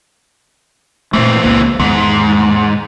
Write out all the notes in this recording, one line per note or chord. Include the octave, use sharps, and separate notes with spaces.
A#2 E3 A3 C4
C#2 A#3
E2 G#2 D#3 B3